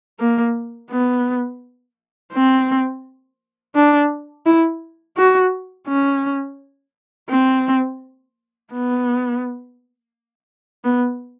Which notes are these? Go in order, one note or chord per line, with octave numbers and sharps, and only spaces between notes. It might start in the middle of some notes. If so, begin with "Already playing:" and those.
A#3
B3
C4
D4
E4
F#4
C#4
C4
B3
B3